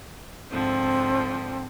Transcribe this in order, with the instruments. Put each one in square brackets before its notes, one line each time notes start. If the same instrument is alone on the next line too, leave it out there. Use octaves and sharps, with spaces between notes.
[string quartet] G#2 D3 F3 [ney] C4